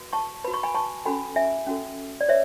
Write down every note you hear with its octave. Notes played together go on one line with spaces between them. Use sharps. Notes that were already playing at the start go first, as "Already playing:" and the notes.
Already playing: F#4 B4
A5 C#6
F#4 B4 B5
C#6
G#5 B5
A5 C#6
C#4 F#4 A4 G#5 B5
E5 G#5
C#4 F#4 A4
D5
B4 C#5 E5